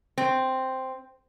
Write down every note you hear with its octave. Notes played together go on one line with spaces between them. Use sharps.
C4